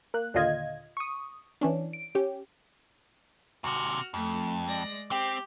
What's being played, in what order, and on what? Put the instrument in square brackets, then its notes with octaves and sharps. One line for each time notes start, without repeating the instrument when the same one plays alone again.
[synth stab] A#3 F#6
D#2 A#2 D3 F4 D#5 G#6
C#6 D#6
E3 C#4 D4
D7
C#4 G4
[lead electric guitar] D#2 C3 [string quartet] F#4 F6
[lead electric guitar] F2 [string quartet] A3
[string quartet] G#3 D5 A#6
[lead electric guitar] C4 [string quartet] G4